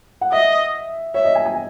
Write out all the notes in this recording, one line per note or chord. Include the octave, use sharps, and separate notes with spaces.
F#5
D#5 E5
C#5 E5
D#5
G#5
G#5